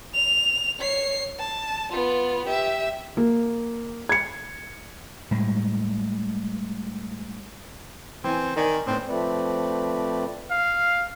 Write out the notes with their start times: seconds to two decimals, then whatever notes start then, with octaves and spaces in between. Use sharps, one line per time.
0.14 F7
0.79 C#5 C7
1.40 A5
1.92 B3 F4
2.46 G4 E5
3.17 A#3
4.09 G#6 C#7
5.31 A2 G3 G#3
8.24 E3 C4 G#5
8.56 D#3 A#4 D5 G#5
8.87 A2 B3 C4
9.08 F3 A3 C4 B4 D5
10.50 F5